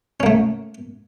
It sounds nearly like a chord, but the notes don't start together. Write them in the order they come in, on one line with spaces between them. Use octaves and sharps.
C#4 A#3 A3